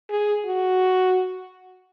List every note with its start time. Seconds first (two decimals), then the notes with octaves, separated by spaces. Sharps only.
0.10 G#4
0.46 F#4